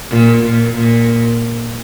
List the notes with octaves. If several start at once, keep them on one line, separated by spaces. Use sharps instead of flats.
A#2
A#2
A#2